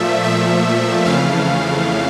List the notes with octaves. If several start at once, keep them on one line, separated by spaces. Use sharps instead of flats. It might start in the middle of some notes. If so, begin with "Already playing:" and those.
Already playing: A#2 F3 A3 E5
E5
F2 C#3 E3 A3 F5